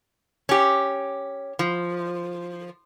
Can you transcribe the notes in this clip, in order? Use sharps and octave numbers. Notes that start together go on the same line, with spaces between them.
C#4 G4
F3